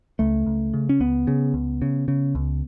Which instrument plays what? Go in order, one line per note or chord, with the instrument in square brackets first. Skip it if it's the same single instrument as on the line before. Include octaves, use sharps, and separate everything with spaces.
[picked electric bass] C#2 A3
C#2
C#3
C#4
C#2 B3
C#3
C#2
C#3
C#3
C#2